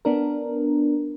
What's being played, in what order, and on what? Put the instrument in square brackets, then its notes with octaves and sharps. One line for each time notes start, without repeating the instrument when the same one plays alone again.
[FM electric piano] B3 D4 A#4